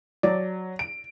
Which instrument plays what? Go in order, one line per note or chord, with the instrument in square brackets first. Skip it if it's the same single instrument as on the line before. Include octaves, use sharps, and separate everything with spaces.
[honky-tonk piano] F#3 [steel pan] D5
[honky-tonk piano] D7